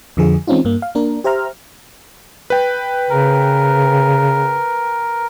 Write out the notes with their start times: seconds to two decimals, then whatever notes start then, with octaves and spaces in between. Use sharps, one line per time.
0.17 F2 D3 F3 G#4
0.47 E3 G#3 C4 C#4 D#4 F4
0.65 G2 A#3
0.82 F5
0.95 A#3 D4 A#4
1.24 G4 C5 E5 A#5 F6
2.50 B4 G5
3.10 C#3 A#4